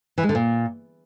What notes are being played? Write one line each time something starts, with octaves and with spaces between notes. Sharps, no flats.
E3
G#3
D3
A#2